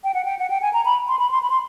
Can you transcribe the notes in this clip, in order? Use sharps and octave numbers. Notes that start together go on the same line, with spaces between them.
G5
F#5
G5
F#5
G5
G#5
A#5
B5
C6
B5
C6
B5
C6